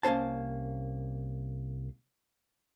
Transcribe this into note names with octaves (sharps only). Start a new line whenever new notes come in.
C2 A#3 C#4 C5 A5